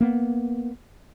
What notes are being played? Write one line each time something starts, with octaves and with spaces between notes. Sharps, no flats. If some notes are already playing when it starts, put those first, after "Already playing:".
A#3 B3